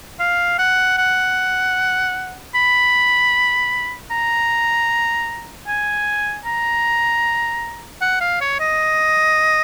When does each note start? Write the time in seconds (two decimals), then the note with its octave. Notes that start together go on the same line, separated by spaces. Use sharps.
0.20 F5
0.59 F#5
0.98 F#5
2.55 B5
4.11 A#5
5.67 G#5
6.45 A#5
8.02 F#5
8.21 F5
8.41 C#5
8.60 D#5